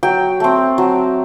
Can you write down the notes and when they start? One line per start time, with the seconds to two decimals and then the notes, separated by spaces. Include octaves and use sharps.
0.03 F#3 G5
0.40 A3 C4
0.78 F#3